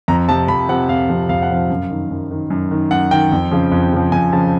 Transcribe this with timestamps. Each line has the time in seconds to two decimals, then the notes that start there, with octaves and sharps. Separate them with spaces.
0.08 F2 A#5
0.29 C3 F3 A5
0.48 F2 B5
0.69 C3 F3 F#5
0.89 F2 F5
1.09 C3 F3
1.29 F2 F5
1.42 F#5
1.50 C3 F3 F5
1.70 F#2
1.90 D#3
2.11 F#2
2.31 D#3
2.50 F#2
2.71 D#3
2.91 F#2 F#5
3.11 D#3 G5
3.32 F2
3.51 C#3 F3
3.72 F2
3.92 C#3 F3
4.12 F2 G#5
4.33 C#3 F3 A5